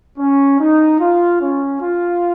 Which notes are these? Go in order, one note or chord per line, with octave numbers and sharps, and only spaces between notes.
C#4
D#4
F4
C#4
F4